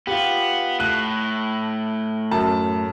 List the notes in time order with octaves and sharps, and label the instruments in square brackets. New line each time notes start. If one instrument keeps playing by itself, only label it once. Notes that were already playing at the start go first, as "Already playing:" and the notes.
[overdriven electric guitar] B3 [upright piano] F4 G4
[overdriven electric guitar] A2 [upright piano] F#6
[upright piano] F#2 A5